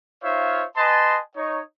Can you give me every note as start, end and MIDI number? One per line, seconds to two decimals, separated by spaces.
0.23 0.64 63
0.23 0.64 65
0.23 0.64 72
0.23 0.64 73
0.23 0.64 76
0.23 0.64 77
0.77 1.19 71
0.77 1.19 75
0.77 1.19 80
0.77 1.19 81
0.77 1.19 84
1.37 1.61 63
1.37 1.61 73